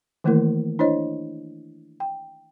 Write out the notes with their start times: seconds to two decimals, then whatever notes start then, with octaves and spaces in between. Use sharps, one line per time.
0.24 D#3 E3 A3 A#3 E4 A#4
0.79 D4 E4 C5 C#5 D#5
2.00 G5